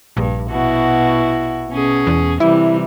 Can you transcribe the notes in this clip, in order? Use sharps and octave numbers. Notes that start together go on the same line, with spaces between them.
A#1 G2
B2 E4 F#4
B2 C#4 G#4
E2
C3 E3 G3 E4